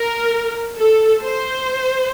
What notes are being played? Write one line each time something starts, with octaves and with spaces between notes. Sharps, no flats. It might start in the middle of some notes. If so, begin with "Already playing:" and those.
Already playing: A#4
A4
C5